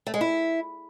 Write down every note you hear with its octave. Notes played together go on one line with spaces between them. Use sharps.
A3
G#3
E4